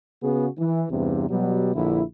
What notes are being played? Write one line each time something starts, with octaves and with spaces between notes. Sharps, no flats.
C#3 B3 F#4 G#4
E3
E2 G2 C3
B2 F#3 G3
A#1 D3 E4